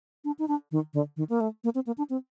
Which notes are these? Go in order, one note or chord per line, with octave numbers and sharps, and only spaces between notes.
D4
D#4
D4
D#3
D3
D#3
A#3
A3
A#3
C4
A#3
D4
C4